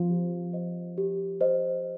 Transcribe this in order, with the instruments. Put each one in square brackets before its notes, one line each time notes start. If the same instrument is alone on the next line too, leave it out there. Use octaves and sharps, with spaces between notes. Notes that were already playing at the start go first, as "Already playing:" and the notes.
Already playing: [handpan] F3 [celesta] C5
[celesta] G4
C5 D#5
G4
C5 D#5